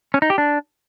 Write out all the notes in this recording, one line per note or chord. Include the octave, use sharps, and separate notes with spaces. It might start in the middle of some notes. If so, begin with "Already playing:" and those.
C#4
D#4
G4
D4